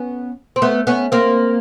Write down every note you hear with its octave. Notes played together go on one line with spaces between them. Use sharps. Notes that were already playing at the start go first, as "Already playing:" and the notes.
Already playing: B3 C#4
C4
A3 B3
B3 C#4
A#3 C4